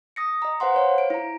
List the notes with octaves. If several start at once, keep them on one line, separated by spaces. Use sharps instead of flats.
D#6 A#6 C#7
D#5 A#5
B4 C5 F5 F#5 C6
B4 C#5 F5
D7
E4 A#5